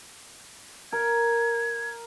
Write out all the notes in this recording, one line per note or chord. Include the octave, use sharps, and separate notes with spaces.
A#4 G#6